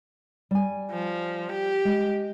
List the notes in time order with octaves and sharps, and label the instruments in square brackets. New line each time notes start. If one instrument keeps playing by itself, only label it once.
[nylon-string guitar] G3 G#5
[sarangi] F3
G4
[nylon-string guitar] G#3